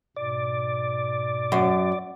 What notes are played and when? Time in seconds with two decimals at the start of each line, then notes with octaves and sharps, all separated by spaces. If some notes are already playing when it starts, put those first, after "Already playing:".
0.16 G#2 B2 D5
1.52 F#2